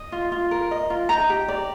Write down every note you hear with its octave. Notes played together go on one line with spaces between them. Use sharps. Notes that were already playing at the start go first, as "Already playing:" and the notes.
Already playing: D#5
F4
F4
A#4
D#5
F4
D#4 A#5
G4
D5